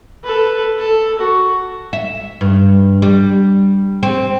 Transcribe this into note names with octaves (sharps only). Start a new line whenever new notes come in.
A4 B4
A4
F#4
E5
G2
G3
C4